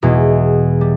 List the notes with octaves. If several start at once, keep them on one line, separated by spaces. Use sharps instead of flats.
E2 B2 G#3
G3